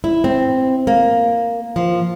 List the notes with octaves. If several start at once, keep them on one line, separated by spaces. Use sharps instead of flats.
E4
C4
A#3
F3